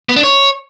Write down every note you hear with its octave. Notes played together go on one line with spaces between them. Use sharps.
B3
D4
C#5